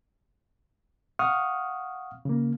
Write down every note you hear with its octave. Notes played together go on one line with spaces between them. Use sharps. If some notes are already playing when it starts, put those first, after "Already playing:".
F5 F#5 C#6 D#6 F6
C#3 A#3